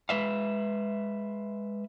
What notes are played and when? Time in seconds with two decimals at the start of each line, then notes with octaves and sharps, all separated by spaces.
0.09 G#3 B4 E5 F5